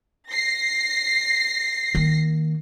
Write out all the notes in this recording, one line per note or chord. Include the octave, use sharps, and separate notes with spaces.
A#6 C7
D#3 A#3